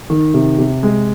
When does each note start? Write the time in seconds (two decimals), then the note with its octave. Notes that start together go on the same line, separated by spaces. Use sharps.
0.10 D#3
0.34 C3
0.58 C3
0.83 G#3